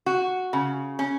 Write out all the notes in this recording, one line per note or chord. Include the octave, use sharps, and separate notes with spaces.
F#4
C#3
C#4